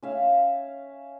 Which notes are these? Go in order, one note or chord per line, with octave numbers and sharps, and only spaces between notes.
C#4 E5 F5